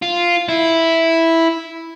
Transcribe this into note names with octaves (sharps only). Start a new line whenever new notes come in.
F4
E4